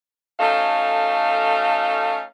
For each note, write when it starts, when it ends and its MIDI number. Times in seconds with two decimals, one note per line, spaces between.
0.39 2.21 57
0.39 2.21 61
0.39 2.21 63
0.39 2.21 66
0.39 2.21 69
0.39 2.21 77